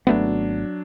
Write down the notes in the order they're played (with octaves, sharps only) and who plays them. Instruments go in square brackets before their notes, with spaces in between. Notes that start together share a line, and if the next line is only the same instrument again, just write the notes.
[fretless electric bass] G#1 A3 B3 [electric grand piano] F#3 D4